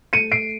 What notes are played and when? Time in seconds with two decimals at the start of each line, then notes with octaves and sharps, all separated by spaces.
0.13 A3 C#7 D#7
0.32 C7 D7